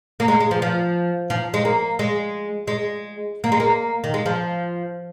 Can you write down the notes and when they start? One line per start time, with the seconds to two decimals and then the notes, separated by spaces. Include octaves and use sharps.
0.20 A#3
0.28 G#3
0.40 G#3
0.51 F3
0.62 F3
1.30 F3
1.54 G#3
1.65 A#3
1.99 G#3
2.68 G#3
3.44 A#3
3.52 G#3
3.60 A#3
4.04 D#3
4.14 G#3
4.26 F3